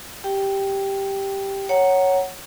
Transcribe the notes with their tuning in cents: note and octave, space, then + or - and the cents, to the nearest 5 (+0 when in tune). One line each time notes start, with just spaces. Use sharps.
G4 +0 G5 +0
C#5 +0 F#5 +10 A#5 +0